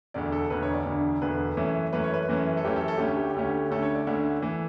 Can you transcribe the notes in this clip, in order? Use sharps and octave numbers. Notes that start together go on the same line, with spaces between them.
E1 D2 D3 D5
A4
E1 D2 D3 B4
C#5
D5
E1 D2 D3
E1 D2 D3 B4
F#2 E3 A3 C#4
F#2 E3 A3 C#4 B4
C#5
B4
F#2 E3 A3 C#4
A4
F#2 E3 A3 C#4 G4
A4
A4
D2 D3 A3 C#4 G4
G4
D2 D3 A3 C#4
D2 D3 A3 C#4 A4
C#5
D5
D2 D3 A3 C#4 E5
E3 A3